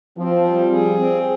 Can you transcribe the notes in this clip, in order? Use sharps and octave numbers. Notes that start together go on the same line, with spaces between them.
F3 C4
G3
G#4
C4